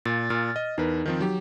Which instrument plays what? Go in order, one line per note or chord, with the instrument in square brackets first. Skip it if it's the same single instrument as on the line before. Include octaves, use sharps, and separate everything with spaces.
[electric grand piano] A#2 [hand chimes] A6
[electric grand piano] A#2 [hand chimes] F6 A6
[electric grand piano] D#5
[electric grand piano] E2 A#4 B4 [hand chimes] D#4
[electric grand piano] D#3 F3 C4
F#3 G4